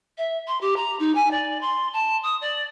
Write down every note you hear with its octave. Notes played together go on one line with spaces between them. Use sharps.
E5
C6
G4
A#5
D#4
G#5
D5
C6
A5
D#6
D5